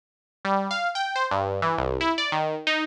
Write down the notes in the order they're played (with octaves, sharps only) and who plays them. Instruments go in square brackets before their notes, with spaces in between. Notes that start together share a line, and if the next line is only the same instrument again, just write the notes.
[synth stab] G3
F5
G5
C5
G2
E3
C2
E4
D5
D#3
D#4